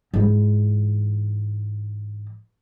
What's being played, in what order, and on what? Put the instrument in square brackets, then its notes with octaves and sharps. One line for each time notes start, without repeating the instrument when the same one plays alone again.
[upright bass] G#2 E3